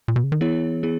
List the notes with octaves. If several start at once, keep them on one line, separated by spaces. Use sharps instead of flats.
A#2
B2
C#3
D#3
E3 B3 E4 G#4 C#5
B3 E4 G#4